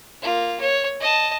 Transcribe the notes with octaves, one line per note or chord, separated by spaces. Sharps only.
A#3 F4
C#5
D#5 A5